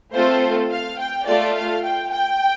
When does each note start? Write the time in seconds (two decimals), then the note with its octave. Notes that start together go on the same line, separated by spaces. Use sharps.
0.14 A3 C4 F4 A4 C5
0.71 F5
0.99 G5
1.26 A3 F4 A4 D5
1.55 F5
1.83 G5
2.11 G5